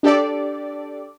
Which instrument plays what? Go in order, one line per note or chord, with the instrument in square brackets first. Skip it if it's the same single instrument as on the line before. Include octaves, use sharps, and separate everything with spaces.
[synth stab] D4 G4 A4 D5